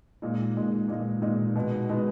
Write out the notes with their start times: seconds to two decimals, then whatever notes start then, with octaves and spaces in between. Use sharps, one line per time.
0.22 A#2 G#3 D#4
0.56 A#2 G#3 D#4
0.88 A#2 G#3 D#4
1.22 A#2 G#3 D#4
1.55 B2 G#3 D#4
1.89 B2 G#3 D#4